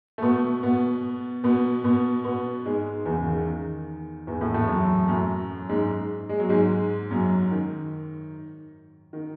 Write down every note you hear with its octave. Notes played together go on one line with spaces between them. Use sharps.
A3
B2 B3
B2 B3
B2 B3
B2 B3
B2 B3
G#2 G#3
E2 E3
C#3
D#3
D#3
E2 E3
A2 A3
A2 A3
F#2 F#3
F#2 F#3
G#2 G#3
G#3
F#3
G#2 G#3
F#2 F#3
D#3
D#3